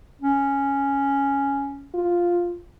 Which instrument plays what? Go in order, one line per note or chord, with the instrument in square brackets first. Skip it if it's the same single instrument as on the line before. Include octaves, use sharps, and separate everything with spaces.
[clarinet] C#4
[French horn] F4